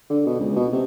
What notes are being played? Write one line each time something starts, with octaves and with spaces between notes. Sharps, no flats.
D3
B2
C#2
B2
C3